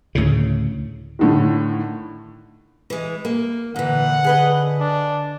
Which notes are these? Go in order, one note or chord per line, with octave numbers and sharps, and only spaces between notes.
D2 A2 C#3
A2 D3 D#3
E3 G#3
A#3
A#2 D3 E3 F#5
G#4 B4 D#5
D4